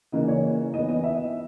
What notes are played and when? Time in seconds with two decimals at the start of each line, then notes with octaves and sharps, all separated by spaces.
0.12 C#3 E3 A#3 D#5
0.28 C#5
0.73 E3 B3 D#5
0.89 D#5
1.04 E5